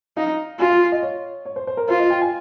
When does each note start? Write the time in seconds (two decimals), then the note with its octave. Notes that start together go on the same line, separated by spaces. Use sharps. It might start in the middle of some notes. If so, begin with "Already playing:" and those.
0.17 D#4 F5
0.59 F4 G#5
0.70 F5
0.92 D#5
1.02 C#5
1.45 C#5
1.56 C5
1.67 C5
1.77 A#4
1.89 F4 C5
1.99 D#5
2.10 G5
2.21 G#5